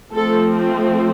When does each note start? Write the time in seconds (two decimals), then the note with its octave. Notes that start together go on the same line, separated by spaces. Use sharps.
0.14 F3 A3 C4 A4